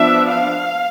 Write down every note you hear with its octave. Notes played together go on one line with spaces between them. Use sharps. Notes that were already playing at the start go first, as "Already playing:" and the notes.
Already playing: F3 B3 D4 E5
F5